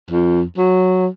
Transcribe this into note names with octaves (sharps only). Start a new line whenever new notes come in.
F2
F#3